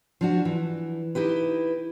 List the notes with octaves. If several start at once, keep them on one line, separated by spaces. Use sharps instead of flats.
F3 D4 F#4
E3
D#4 E4 G4 B4